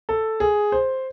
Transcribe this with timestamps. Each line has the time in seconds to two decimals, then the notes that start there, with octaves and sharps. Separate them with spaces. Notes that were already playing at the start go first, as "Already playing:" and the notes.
0.09 A4
0.40 G#4
0.72 C5